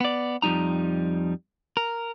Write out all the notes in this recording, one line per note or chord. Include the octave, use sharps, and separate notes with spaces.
B3 D5
F2 F3 G3 D#4 A#5
A#4